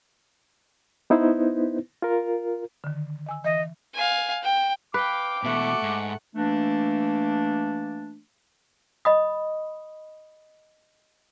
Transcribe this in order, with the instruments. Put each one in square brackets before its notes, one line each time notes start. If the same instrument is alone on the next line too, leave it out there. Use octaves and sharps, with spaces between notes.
[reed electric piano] B3 D#4 E4 B4 C5
F4 A#4
[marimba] D3 D#3
D#5 G#5 E6
[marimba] E3 [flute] D#5
[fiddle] F5 G#5
G5
[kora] B4 [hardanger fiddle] F5 G5 [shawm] D6
[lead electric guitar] B2 E3 [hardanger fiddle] A3 F#5
[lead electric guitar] G#2
[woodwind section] E3 A3 A#3 D4
[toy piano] D#5 B5 D#6